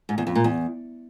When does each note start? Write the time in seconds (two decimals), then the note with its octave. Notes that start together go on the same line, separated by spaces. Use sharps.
0.09 G#2
0.18 E2
0.27 F2
0.35 A#2
0.44 E2